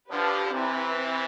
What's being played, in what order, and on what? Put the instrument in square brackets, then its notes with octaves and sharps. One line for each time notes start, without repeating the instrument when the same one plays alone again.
[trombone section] D3 F3 [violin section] D4 G4 B4
[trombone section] C3 E3 [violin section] C4 E4 B4
[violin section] C4